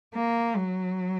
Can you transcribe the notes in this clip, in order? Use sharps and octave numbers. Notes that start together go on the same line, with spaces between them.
A#3
F#3